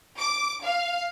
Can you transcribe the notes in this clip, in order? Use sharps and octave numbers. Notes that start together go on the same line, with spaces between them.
D6
F5